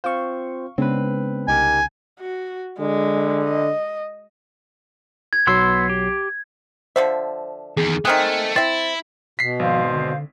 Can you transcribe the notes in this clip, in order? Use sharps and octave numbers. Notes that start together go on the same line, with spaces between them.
C4 F4 C5 F5 C#6
C#3 G#3 B3 C4 D4 B4
C2 D#4 G4 A#4 G#5
F#4
D3 G#3
D#5
G#6
B1 F#3 B3 C6 E6 C7
G4
D3 F3 C5 E5
E2 D#3 G#4
D#3 A3 C4 G#4 F6 F#6
C4 E4 E5 A6
B2 B6 C7
G#1 F3 C5 F5
D3